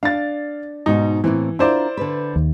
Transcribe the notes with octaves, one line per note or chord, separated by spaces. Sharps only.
D4 F5 A6
G#2 B2 D#4 F#4
A2 E3 A#3 C4
D4 E4 F4 A#4 C5 D5
D3 B4
D#2